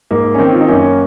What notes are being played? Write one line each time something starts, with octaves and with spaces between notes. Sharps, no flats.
G#2 A#3
C#4
D#3 C4
F4
D#4
F#2 A#3 C#4